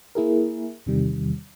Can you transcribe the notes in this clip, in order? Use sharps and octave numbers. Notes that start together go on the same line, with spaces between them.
A#3 E4 G#4 A#4
E2 C3 D#3 G3